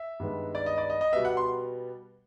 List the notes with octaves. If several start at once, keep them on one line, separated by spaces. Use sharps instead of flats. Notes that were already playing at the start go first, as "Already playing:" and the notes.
Already playing: E5
G2 D#3 G#3 B3
D5
D#5
D5
D#5
D#5
B2 G3 B3 E5
F#5
C6